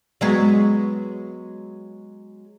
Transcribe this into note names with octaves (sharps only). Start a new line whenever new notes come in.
F#3 G#3 B3